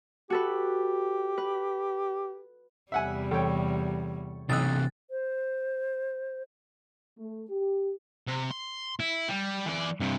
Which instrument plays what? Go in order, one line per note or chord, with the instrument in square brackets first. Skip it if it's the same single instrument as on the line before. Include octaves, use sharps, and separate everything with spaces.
[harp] F#4 A4 B4 [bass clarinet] G4
[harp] B4
[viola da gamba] E2 C3 G3 [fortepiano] E5 F#5 G#5
[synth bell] E3 [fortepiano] A4 C#5 G5
[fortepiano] B1 D#6 E6 [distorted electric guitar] C3 E3 [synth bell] F#6 A6
[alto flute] C5
[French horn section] A3
G4
[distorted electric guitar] C3
C6
E4
G3
E3 D5
G2 C3